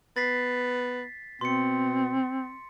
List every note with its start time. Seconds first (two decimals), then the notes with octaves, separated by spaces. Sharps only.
0.16 B3 A6 B6 C7
1.41 B2 C4 C6 C#7